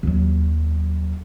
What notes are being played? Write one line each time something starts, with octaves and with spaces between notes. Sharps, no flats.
D#2 F#3